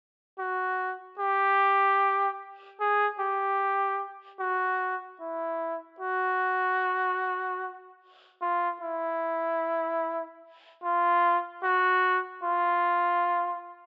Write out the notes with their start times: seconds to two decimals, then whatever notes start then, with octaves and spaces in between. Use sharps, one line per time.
0.39 F#4
1.19 G4
2.80 G#4
3.20 G4
4.40 F#4
5.21 E4
6.01 F#4
8.42 F4
8.82 E4
10.84 F4
11.64 F#4
12.44 F4